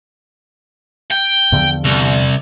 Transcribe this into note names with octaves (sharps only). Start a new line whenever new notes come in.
G5
E2 D3 F3
C2